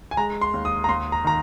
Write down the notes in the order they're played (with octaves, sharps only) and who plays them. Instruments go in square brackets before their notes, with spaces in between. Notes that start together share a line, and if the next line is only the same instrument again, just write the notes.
[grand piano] G#5
G#3 A#5
C6
D#2
D#6
A#5
D#2 C6
A#5
D#3 A#5